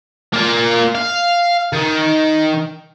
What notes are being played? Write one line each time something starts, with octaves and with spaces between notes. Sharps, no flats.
A#3 F4
F5
D#3